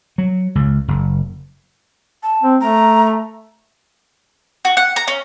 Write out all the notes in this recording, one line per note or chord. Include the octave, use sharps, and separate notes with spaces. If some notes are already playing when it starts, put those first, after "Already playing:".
F#3
C#2
F#1
A5
C4
A3 A#5
F#4
F#5
A#5
C#4